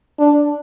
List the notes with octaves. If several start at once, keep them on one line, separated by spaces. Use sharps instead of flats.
D4